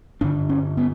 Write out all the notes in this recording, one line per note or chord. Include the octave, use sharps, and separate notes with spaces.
G2 D3 D4
C#4
B3